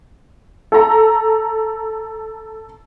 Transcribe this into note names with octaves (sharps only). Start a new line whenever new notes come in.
A4 A#5